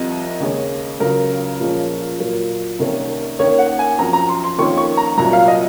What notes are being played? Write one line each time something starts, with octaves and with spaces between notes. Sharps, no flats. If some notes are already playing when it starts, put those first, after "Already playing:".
Already playing: C2 C3 F3 D#5
D#2 C#3 G#3 C#4
C#2 C#3 F#3 C#4 A#4
A#2 F3 G#3 C#4
A#2 F#3 A#3
C2 C3 D#3 A#3 C#4
D#2 D#3 A#3 C#4 C#5
F#5
G#5
F#2 F3 C4 A#5
A#5
C6
C6
F2 D#3 A#3 C#4 C#6
C#6
A#5
C2 A#2 F#3 A#5
F5
D#5